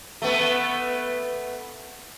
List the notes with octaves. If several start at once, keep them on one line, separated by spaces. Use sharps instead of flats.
A3 B3